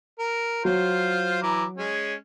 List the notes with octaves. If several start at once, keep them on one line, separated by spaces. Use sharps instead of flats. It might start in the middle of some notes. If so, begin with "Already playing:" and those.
A#4
F#3 F4 C5
E3 A#5 D6
G#3 C#4